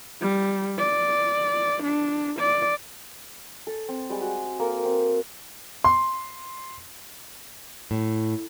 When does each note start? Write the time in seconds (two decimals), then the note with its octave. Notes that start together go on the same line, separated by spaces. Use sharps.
0.22 G3
0.79 D5
1.83 D4
2.40 D5
3.67 A4
3.88 C4
4.10 G3 G#3 D#6
4.21 F#4
4.59 A#3 A4 A#4
4.85 C4
5.84 C6
7.91 A2